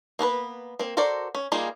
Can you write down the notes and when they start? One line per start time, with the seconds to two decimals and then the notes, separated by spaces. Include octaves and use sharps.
0.19 A#3 B3 A#4 B4
0.79 A#3 C4
0.97 F#4 A4 A#4 C5 D5
1.35 C#4
1.52 G3 A#3 D#4 F4 G#4